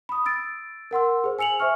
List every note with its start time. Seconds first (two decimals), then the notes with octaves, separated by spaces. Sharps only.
0.09 B5 D#6
0.26 E6 A6 D7
0.91 A#4 F#5 C6 E6
1.24 G#4 C5
1.39 G#5 E6 C#7 F7 F#7
1.60 C5 E5 G#5 C#6 F6